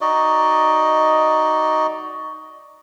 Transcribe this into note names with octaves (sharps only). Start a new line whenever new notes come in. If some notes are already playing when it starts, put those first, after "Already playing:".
D#4 F#4 D5 D#5